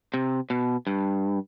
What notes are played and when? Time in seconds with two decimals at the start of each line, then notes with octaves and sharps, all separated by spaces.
0.14 C3
0.50 B2
0.87 G2